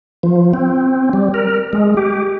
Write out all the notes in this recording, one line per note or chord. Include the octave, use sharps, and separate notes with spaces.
F3
C4
G3
A#4
G#3
G4